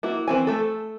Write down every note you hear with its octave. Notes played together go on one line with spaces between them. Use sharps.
A#3 E4 F#4
E3 C4 G#5
A3 A4